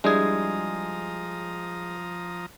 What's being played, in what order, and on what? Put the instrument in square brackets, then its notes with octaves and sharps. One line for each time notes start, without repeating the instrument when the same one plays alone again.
[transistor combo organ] F3 A#5 D#6 [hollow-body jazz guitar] G3 D4 E4 [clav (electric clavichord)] G#3 G#4